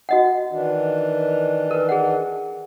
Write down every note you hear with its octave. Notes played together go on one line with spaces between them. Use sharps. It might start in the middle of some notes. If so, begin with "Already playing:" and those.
F#4 D#5 F#5
D#3 E3 D4
A#4 B4
G#4 F#5